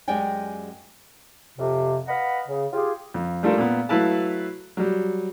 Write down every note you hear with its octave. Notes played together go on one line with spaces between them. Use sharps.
F#2 G#3 G4 D5 G5 G#5
F2 C3
B4 D#5 F5 F#5 A#5 B5
C#3
F4 G4 G#4
F2
G3 A3 D4 F4 A4 A#4
A#2 B3
F#3 A3 E4 B4 F5 A5
F#3 G3